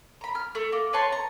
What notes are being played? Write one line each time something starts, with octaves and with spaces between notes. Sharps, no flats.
A#5 B5
F6
A3
A#3
B4 C#5 A5 C6
A#5